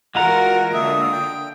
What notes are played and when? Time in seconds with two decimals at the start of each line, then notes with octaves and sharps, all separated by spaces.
0.15 E3 G#3 F4 F#4 A#4 F#5 A#5
0.74 D3 A#3 E5 D#6
1.12 G5